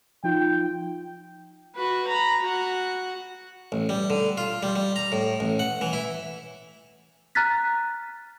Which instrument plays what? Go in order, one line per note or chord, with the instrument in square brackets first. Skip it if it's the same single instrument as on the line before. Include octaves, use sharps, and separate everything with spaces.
[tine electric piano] F3 D#4 F4 [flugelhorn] G5
[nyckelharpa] F#4 B4
A#5 B5
F#4 F#5
[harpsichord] A1
G3
D3
F4
G3
G3
A#5
A2
A1
F#5
E3
E4
[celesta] A#5 F6 F#6 A6 B6